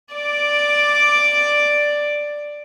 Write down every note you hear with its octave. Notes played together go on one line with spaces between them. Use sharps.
D5 D6